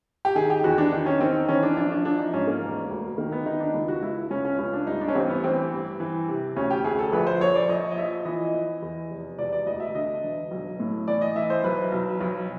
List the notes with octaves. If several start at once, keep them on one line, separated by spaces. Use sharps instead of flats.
G4
D#3 G#4
G4
E2 F#4
D4
D#3
C#4
D#3 C4
E3 C#4
D4
A#1 D4
D4
A#1 D4
D#4
G#2 C#4
A#3
E1
D2
D#3 A#3
B3
D#3 D#4
D4
C#2
F#4
C#2 E4
C#2 C#4
C#4
C#2 C#4
D4
G2 D#4
D4
C#4
A1 C4
B3
E3 C4
G2
E3
C3
D2 C#4
G4
D2 G#4
A4
A#1 B4
C5
A#1 C#5
D5
A#1 D#5
D#5
F3 E5
E3 D#5
E3
E2
F1
E1 D5
D5
D2 D#5
E5
D3 D#5
E1
B1
A2
E3 D5
D#5
E3 E5
C5
B1 B4
B1
B1